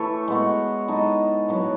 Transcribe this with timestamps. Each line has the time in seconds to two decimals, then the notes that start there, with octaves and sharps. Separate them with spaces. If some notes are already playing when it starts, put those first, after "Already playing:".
Already playing: E3 A3 E4 A4 C#5
0.28 G#3 B3 F#4
0.88 G#3 D#4 A4 D#5
1.48 A2 F#3 B3